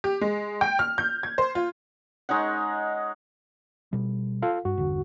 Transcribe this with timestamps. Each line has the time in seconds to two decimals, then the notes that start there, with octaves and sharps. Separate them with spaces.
0.04 G4
0.21 G#3
0.61 G5
0.79 F6
0.98 G6
1.23 G#6
1.38 C5
1.55 F4
2.29 G#3 D#4 C#5 F#5
3.93 B2 G3
4.42 F4 A4 F5
4.65 G2 F#4
4.78 G1 E2 D3